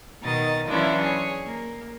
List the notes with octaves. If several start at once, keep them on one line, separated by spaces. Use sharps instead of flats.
B2 D#3 D#5 A6
E3 F#3 C#4 D4 E4 F4
G#4 C#5
A#3